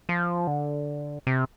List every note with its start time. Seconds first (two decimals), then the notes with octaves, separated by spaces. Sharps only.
0.09 F3
0.47 D3
1.27 C3